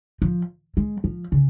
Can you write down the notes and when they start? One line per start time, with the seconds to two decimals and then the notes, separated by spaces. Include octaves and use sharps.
0.22 F3
0.77 G#3
1.04 F3
1.32 C#3